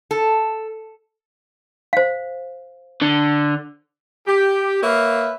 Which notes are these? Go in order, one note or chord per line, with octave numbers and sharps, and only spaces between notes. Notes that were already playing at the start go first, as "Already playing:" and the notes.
A4
C5 F5
D3
G4
A#3 B4 C#5 E5 F5